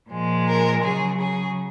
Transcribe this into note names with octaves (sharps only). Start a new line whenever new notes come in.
A#2 F3 G#3
A#4
C#3 F#3 G#4
G#4